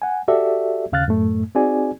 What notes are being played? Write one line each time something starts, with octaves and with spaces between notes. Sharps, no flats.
F#5 G#5
F#4 G4 A4 D5 E5
D#2 C#3 F5 F6 F#6 A6
F#2 A2 A3
C4 D#4 F#4 G#4 D5 G#5